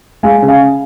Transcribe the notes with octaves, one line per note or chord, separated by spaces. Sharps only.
G#3 F5 G#5
C#3
F5 G#5